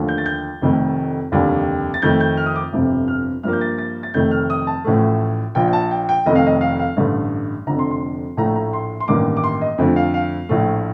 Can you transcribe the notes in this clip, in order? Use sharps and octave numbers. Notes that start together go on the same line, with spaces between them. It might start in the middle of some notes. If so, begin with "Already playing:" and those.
Already playing: D#2 D3 F3 A3
G6
A6
G6
F1 F2 D#3 A3
F1 D#2 D3 G3
A6
F2 D#3 A3 G6
G6
F6
D#6
D6
G1 F2 C3
F6
G2 F3 A#3 F6
G6
A6
A6
A6
F1 F2 D#3 A3 G6
F6
D#6
A5
A1 A2 F3 A3
A#1 A#2 F3 G5
G5
A5
G5
G5
F1 F2 D#3 A3 D#5
F5
D#5
F5
F5
A1 G2 D3 A3
F1 F2 D3 A#5
C6
C6
A#1 A2 A3 A#5
A#5
C6
C6
A1 G2 D#3 A#3 D6
D6
C6
D#5
F2 D3 F3 A3
F5
F5
A#1 A2 F3 A3